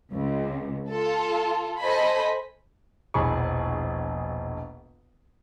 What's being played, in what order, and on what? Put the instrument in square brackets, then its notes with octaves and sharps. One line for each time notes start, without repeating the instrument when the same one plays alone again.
[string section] C#2
F4 A4
A4 C5 D#5 G#5 B5
[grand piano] E1 A#1 G#4 B5 C#6